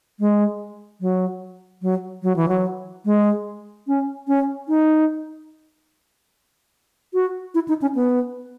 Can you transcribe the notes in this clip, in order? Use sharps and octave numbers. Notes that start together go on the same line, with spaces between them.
G#3
F#3
F#3
F#3
E3
F#3
G#3
C#4
C#4
D#4
F#4
E4
D#4
C#4
B3